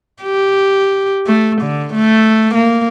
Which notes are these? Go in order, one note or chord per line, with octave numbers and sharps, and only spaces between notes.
G4
A3
D3
A3
A#3